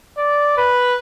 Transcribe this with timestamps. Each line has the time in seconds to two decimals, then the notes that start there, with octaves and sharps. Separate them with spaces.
0.18 D5
0.57 B4